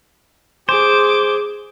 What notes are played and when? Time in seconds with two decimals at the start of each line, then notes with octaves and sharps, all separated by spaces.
0.69 G#4 C5 D6